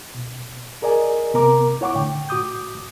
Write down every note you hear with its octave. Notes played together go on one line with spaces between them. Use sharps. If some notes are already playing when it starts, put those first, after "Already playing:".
B2
G#4 A#4 D5 D#5 G#5
C3 B3 A#4 A#5 D6
E4 C#5 F#5 C#6 D6
A2 D3 G5
A2 F#4 D6 D#6 G6